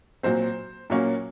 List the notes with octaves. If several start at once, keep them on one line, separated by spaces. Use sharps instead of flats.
A#2 F#3 C4 C5
A#2 F#3 A#3 C#4